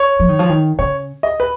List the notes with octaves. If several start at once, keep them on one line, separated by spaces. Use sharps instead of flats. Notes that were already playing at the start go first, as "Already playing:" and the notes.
Already playing: C#5
F3
D#3
F3
D#3
C#3 C#5
D#5
B4